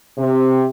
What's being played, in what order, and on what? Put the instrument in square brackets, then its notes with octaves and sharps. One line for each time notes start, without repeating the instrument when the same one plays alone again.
[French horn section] C3